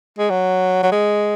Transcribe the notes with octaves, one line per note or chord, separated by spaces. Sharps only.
G#3
F#3
F#3
G#3